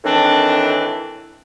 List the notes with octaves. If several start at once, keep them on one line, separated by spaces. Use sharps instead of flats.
A2 D#3 E3 C4 D4